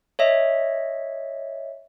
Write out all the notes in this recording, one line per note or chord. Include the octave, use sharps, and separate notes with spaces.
C#5 D#5 E5